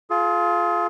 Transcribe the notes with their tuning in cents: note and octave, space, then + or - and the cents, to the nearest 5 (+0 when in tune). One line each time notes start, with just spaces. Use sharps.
F4 +0 G#4 +40